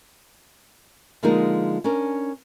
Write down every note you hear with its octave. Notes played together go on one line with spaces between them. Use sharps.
D3 F3 G#3 A#3 D#4 A#4
C#4 D4 A#4